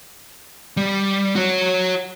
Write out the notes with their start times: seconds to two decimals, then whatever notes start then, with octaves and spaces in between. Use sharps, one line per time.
0.77 G3
1.36 F#4 C#5